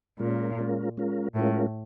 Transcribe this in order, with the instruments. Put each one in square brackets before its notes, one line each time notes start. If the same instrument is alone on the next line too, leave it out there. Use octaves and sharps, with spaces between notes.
[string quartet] A#2 [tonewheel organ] G#3 C#4 F4 A#4
[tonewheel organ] G#3 C#4 F4 A#4
G#3 C#4 F4 A#4
[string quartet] A2 [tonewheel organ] G#3 C#4 F4 A#4